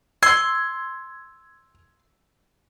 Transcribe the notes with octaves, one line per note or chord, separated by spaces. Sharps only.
C6 E6 G#6